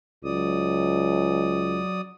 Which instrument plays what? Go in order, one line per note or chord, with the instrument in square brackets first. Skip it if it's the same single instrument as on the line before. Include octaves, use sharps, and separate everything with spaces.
[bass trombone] C#2 [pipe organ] F#3 D5 D#6